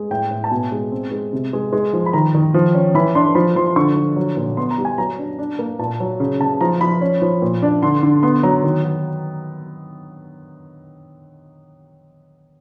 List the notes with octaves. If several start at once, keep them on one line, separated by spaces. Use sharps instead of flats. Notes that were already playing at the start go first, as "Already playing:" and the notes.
Already playing: G#3
A2 G5
A2
A5
B2 G#5
G#3
C4
G#3
C3
G#3
G#3
F3
B5
D#3 A#5
D#3
F3
C#4
E3 B5
D4 C6
F3 B5
F3 C6
D3 C#6
F3
F#3
A#2
B3 C6
A#5
G3
G#5
F#3 A#5
D4
D4
A#3
A#2 A5
F#3
C#3
C#3 A5
F3 A#5
F3 B5
C#4
F3
A#2
D4
D3 C6
D3
B3 C6
F#3 A#5
D#3
F#3